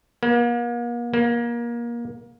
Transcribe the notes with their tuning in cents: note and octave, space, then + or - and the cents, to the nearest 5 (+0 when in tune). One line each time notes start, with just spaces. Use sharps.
A#3 +40
A#3 +25